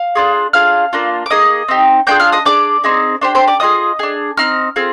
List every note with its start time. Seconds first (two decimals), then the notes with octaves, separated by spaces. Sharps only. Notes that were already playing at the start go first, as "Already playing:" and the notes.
Already playing: F5
0.15 D4 F4 G#4
0.53 D4 F4 G#4 F5 F6
0.93 A#3 D4 F4
1.26 D6
1.30 A#3 D#4 G#4 D#5 D#6
1.68 C4 D#4 G4
2.07 A#3 D4 F4 G#4 G5 G6
2.20 F5 F6
2.32 D#5 D#6
2.45 D4 G#4 D5 D6
2.84 C4 D#4 G#4
3.21 D4 G4 C5 C6
3.35 C5 C6
3.47 D5 D6
3.60 D4 F4 G#4 D#5 D#6
3.99 D4 G#4
4.37 C4 D#4 F6
4.76 C4 F4 G#4